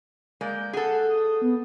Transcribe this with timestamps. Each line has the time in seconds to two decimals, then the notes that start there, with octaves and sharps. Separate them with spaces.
0.41 G#3 A#3 D5 G6
0.73 G#4 A4 F#5
1.09 D#6
1.42 B3